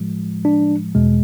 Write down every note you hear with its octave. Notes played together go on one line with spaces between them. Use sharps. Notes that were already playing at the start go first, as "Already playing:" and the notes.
Already playing: A2 F3 G#3
D4
E2 B2 G#3